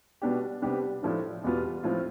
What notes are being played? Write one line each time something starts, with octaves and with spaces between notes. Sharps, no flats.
B2 G3 B3 D4 G4
C3 G3 B3 D4 G4
A2 F3 A3 D4
E2 B2 G3 B3 F4
A2 F3 C4 F4